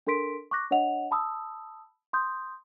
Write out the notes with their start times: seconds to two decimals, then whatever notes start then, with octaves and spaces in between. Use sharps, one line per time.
0.07 D4 A4 A#4 C6 B6 D7
0.51 C#6 D6 F#6 A#6
0.71 D4 C#5 D#5 F#5 F7
1.11 A5 B5 D#6 E6
2.13 C6 D#6 G6